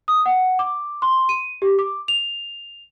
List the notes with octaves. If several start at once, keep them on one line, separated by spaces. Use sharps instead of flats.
D#6
F#5
D6
C6
D#7
G4
D6
F7